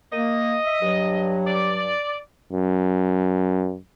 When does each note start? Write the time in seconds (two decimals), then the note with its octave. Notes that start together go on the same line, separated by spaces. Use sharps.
0.12 A#3 D#5
0.64 E5
0.82 G2 F#3
1.46 D5
2.53 F#2